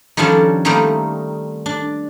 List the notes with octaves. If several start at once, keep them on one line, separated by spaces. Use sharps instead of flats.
D#3 F3 G3 C#4 D4 A4
D#3 G3 A3 A#3 C4 D#4
D4